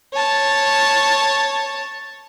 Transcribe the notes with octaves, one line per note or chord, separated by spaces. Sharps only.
C#5 A5